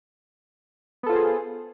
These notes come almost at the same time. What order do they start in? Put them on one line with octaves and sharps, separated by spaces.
B3 A4 F4 C5 G#4